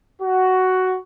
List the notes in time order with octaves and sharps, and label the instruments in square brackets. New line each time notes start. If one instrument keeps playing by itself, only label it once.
[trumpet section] F#4